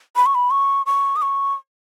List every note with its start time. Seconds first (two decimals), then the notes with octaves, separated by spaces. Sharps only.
0.16 B5
0.26 C#6
0.35 B5
0.51 C#6
0.86 C#6
1.16 D#6
1.22 C#6